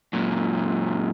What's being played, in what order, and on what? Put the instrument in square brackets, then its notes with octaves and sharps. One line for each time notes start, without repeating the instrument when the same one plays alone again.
[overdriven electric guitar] F#2 A#2